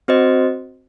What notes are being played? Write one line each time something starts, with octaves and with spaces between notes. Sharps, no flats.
C4 F#4 C5 D#5